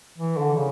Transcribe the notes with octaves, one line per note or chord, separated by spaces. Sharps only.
E3
D3
C#3